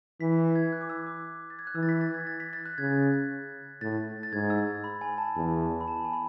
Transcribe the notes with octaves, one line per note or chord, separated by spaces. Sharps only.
E3 B6
G#6
F#6
D6
E6
D6
A6
G#6
F#6
E3 E6
A6
B6
A6
G#6
A6
B6
A6
F#6
C#3 G#6
A2 A6
A6
G#2 G#6
E6
B5
G#5
A5
E2
B5
A5
G#5
B5